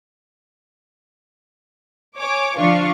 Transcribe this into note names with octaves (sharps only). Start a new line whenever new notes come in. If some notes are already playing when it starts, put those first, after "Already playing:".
C#5 G#5 D6
D3 F3 D4 F4 F5 C#6